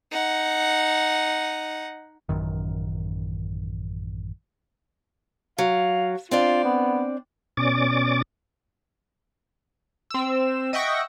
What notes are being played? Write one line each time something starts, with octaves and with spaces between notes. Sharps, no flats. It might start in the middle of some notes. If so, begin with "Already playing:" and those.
D#4 F#5
A1 F#2 D#3
F#3 F5
C4 D4 F4 D5
B3
B2 C#4 D5 D6 A6
C4 E6
D#5 E5 F#5 G5 C#6 A#6